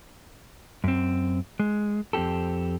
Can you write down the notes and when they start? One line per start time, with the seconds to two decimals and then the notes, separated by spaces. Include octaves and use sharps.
0.84 F#2 C4
1.59 G#3
2.13 F2 C4 F#4 G4 A4